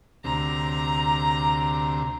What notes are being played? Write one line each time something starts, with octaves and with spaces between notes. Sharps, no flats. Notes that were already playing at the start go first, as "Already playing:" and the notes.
D2 C3 A#5